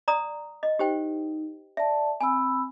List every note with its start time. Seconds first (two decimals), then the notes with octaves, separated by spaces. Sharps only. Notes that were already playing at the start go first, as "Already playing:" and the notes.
0.08 D5 A#5 D#6
0.63 D#5
0.79 D#4 G4 C5 G5
1.77 D5 E5 A5
2.21 C4 G#5 B5 E6